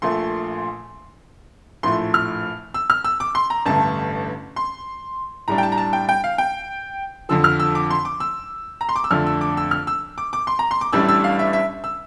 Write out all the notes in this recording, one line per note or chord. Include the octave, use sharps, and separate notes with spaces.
A#1 A#2 A3 C6
A#1 A2 F3 A3 C6
F6
E6
F6
E6
D6
C6
A#5
A1 G2 D3 A3 A5
C6
A2 G3 D4 A#5
G5
A5
A#5
A5
G5
G5
F5
G5
F2 D3 F3 E6
F6
E6
D6
C6
D6
E6
A#5
C6
D6
E6
F2 D3 A3 D4 F6
E6
D6
E6
F6
E6
D6
D6
C6
A#5
C6
D6
A1 A2 G3 D4 E6
E6
F5
E5
E5
E6